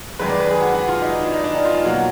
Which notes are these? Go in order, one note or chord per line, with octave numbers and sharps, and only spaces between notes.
F#2 D#3 G#3 B4
D5
B4
G#4
F#4
F#4
F4
D#4
D4
D#4
D4
D#4
F4
F4
B2 F#3 A#3 F#4